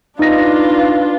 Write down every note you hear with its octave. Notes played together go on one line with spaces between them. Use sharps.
D4 D#4 F4 B4 A#6